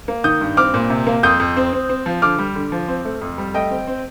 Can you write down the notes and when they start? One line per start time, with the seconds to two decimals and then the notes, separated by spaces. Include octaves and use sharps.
0.08 A#3
0.24 D#3 D#6 G6
0.41 G2
0.57 C4 D6 F6
0.74 A#2
0.90 C3
1.07 A#3
1.23 F2 D#6 G6
1.40 F2
1.56 C4
1.73 C4
1.89 C4
2.06 F3
2.22 D3 D6 F6
2.38 G3
2.55 D3
2.72 F3
2.88 C4
3.05 A3
3.21 F2
3.38 G3
3.54 A3 D#5 G5
3.71 C4
3.87 C4